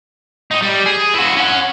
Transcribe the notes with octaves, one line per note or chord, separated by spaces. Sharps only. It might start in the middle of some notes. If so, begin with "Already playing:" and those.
A2 D#4
G3
G#4
E4 F#4
C#4 F#5